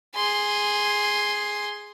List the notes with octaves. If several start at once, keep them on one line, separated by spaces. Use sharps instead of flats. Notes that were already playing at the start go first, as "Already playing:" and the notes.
G#4 C6